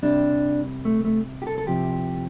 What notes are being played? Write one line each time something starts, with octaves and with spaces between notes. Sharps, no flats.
C2 C3 G3 D4
A3
A3
G4
A4
A4
C2 C3 F3 G4